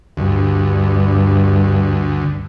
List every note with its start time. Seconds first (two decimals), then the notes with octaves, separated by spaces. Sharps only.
0.17 D2 G2